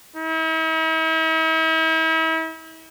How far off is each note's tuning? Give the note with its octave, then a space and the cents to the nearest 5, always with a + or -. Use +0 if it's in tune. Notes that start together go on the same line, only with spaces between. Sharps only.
E4 -45